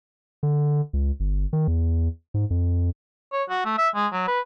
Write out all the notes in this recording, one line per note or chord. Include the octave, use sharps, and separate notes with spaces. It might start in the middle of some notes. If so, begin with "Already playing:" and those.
D3
C#2
G1
D#3
E2
G#2
F2
C#5
F#4
A3
E5
G#3
F#3
B4